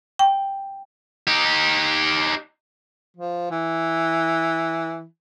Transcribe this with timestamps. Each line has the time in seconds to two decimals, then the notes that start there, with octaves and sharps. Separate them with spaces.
0.19 G5
1.27 D#4 G4
3.16 F3
3.51 E3